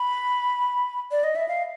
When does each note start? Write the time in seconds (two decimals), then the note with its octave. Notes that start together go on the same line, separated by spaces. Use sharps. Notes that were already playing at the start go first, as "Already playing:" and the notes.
Already playing: B5
1.11 D5
1.24 D#5
1.36 E5
1.48 F5